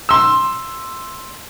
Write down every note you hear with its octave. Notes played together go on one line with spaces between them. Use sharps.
C6 E6